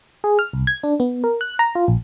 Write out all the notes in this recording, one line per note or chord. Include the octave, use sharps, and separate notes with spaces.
G#4
F6
C2
G#6
D4
B3
A#4
F#6
A#5
F4
A#1